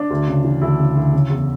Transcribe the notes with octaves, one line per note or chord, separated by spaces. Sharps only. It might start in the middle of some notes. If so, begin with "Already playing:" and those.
Already playing: D4
D2
C#3
E3
D2 E4
C#3
D2
C#3
E2